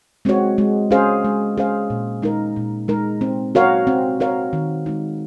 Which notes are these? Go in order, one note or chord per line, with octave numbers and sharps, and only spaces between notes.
G#3 C4 F#4 C#5
G#3
C#4 G#4 C5 F5
G#3
C#4 G#4 C5 F5
A#2
G#3 D#4 A#4
A#2
G#3 D#4 A#4
C4
F#4 A#4 C#5 F5
C4
F#4 A#4 C#5 F5
D#3
G#3 D#4